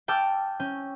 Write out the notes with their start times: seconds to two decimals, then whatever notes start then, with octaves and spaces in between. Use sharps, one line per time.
0.08 G5 A5 D6 E6 F6 G6
0.60 C#4 G6